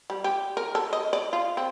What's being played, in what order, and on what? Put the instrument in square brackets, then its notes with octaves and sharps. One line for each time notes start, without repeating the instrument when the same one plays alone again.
[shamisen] G3
G4
A#4
A4
D#5
D5
F4
C4